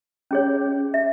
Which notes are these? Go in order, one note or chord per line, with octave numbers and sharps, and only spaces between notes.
C#4 G#4 C#5
E5